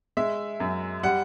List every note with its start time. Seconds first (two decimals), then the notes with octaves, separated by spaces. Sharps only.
0.17 G#3 E5
0.60 F#2
1.03 G3 F#5